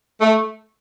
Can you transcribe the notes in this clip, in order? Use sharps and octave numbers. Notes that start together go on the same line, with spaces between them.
A3